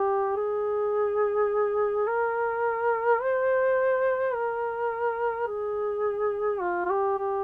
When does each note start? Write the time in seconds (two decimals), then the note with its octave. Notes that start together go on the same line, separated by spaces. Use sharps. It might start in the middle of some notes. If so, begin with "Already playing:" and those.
Already playing: G4
0.36 G#4
2.07 A#4
3.21 C5
4.34 A#4
5.48 G#4
6.61 F4
6.86 F4
6.90 G4
7.18 G4